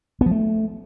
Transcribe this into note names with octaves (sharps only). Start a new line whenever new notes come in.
B3
F3
A3